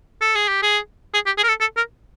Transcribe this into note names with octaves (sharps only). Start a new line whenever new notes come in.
A4
G#4
G4
G#4
G#4
G4
G#4
A#4
A4
A4
A#4